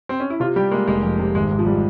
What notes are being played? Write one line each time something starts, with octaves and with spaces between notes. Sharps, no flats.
C4
C#4
E4
C3 F4
G3 G4
G#3 A#3
F1 G#3
F2
C3
G#1 G#3
G#2
F3
G3